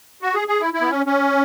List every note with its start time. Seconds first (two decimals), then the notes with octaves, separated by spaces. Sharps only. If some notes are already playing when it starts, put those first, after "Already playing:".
0.22 F#4
0.35 G#4
0.48 G#4
0.61 E4
0.74 E4
0.81 B3
0.90 C#4
1.06 C#4